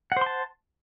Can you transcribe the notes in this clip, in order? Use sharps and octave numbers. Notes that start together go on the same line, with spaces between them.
C5 F#5 A5 C6